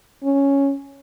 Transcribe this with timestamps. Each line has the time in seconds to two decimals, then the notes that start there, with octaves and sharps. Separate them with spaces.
0.23 C#4